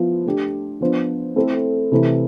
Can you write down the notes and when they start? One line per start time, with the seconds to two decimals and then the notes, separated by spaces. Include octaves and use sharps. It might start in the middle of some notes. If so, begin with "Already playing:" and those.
Already playing: F3 B3 E4
0.26 A3 D4 G4
0.81 F3 B3 D4 F4 C5
1.36 A3 C4 E4 A4
1.92 C3 E3 A3 E4